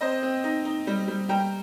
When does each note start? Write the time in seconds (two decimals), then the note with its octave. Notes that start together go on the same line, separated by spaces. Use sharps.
0.01 C4 C5 D#5
0.23 C4
0.44 D#4
0.65 D#4
0.87 G3
1.08 G3
1.29 G3 G5 A#5